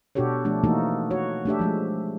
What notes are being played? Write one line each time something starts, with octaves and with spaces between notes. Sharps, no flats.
B2 D4 F#4 G4 A4 C#5
F3 A3 D4
E3 A3 A#3 D#4 F#4 A4
F#4 C#5
A3 D4 G4 E5
F3 G#3 A3